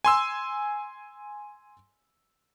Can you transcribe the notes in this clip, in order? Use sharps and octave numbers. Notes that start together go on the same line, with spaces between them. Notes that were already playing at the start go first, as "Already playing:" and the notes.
G#5 C6 E6